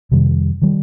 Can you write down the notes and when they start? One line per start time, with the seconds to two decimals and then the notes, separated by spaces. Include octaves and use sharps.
0.12 F2 C3 D#3 G3
0.62 D#3 G3